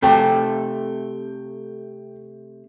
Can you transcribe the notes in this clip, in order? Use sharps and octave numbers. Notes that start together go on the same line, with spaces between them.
C3 A3 A4 G5